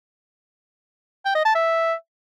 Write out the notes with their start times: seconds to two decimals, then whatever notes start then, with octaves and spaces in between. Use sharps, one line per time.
1.25 G5
1.35 D#5
1.45 A5
1.55 E5